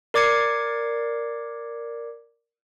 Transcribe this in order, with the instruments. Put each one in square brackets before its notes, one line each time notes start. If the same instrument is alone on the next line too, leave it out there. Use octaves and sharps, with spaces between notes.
[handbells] A#4 D5 D6 G#6 C7 C#7